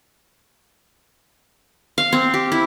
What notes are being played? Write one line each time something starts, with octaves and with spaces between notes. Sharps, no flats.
F5
C4
G4
E4